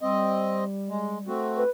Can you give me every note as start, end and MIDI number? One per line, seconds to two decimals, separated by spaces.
0.01 1.28 55
0.01 0.64 60
0.01 0.64 75
0.89 1.18 56
1.27 1.63 57
1.27 1.63 60
1.27 1.63 66
1.57 1.70 71